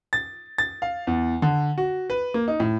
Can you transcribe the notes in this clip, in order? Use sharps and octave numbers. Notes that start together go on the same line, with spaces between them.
A6
A6
F5
E2
D3
F#4
B4
A#3
D#4
A2